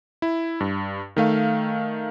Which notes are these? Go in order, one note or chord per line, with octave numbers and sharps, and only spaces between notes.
E4
G2
D#3 A3 F5